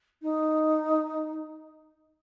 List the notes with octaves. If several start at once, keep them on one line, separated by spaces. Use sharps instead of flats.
D#4